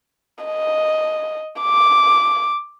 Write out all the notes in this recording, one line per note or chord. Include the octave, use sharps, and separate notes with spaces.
D#5
D6